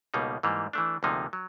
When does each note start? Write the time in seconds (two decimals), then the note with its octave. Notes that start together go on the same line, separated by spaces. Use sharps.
0.14 C#2 B2 G3 A#3 D#4
0.43 G#2 E3 G3 A#3
0.73 E3 A3 D4
1.03 D2 C3 F3 A#3 D#4
1.33 F#3